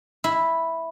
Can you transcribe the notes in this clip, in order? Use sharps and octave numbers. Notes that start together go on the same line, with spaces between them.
E4